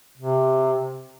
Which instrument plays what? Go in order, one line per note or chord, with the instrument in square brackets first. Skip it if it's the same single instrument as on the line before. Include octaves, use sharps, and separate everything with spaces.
[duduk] C3